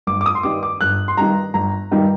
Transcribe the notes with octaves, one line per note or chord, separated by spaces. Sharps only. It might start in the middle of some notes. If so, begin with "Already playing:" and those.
G1 D6
D6
D#6
C6
G2 D#3 G3 D6
D6
G1 F#6
C6
G2 D#3 G3 A#5
G1 A#5
G2 D#3 G3